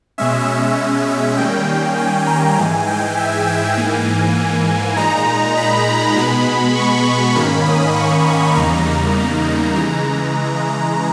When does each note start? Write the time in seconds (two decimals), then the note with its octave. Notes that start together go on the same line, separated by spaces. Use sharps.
0.18 B2 G#3 C#4 E5
0.49 E5
0.78 E5
1.08 E5
1.37 D#3 G3 A#3 C#4 G5
1.97 G#5
2.27 A#5
2.57 G#2 E3 G#3 G#5
2.87 G5
3.17 E5
3.47 G5
3.77 G#2 E3 A#3 G#5
4.96 A#2 G#3 D#4 A#5
5.27 A#5
5.57 B5
6.16 B2 G#3 B3
6.76 C#6
7.06 C#6
7.35 G#2 D#3 A#3 C#4 B5
7.66 D#6
7.96 C#6
8.26 B5
8.56 E2 C#3 G3 A#3 D#4 A#5
9.75 C#3 E3 G#3 A#5